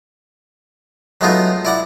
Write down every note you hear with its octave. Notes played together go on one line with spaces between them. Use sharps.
F#3 G#3 A3 B3 D#4 F4
E4 D5 F#5